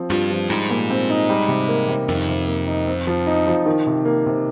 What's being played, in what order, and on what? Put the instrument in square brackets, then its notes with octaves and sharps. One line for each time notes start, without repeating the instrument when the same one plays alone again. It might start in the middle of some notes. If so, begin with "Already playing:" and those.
Already playing: [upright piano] F3 C4
[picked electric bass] G2 [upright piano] F4
[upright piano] F3
[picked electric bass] G#2 [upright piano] G3
[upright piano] A#2
C4
D#4
G3
C3
A#3
C3
[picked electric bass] F2 [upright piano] D#3
[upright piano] C3
A#3
D#4
C4
F3
D#4
F3
D#3
C3
A#3
C3